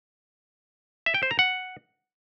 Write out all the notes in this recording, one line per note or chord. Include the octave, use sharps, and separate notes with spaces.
E5
G5
C5
A#5
F#5